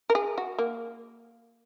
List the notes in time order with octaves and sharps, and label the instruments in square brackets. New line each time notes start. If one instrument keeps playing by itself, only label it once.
[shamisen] A#4
G#4
F#4
A#3